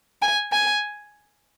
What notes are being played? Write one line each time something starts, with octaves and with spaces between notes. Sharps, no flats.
G#5
G#5